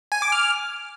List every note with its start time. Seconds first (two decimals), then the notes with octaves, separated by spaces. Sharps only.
0.12 G#5
0.22 D6
0.32 F6